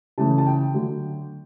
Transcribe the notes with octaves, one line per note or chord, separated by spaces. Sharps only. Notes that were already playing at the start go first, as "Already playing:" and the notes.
C#3 E3 A3 A5
A5
G5
D3 F#3 A3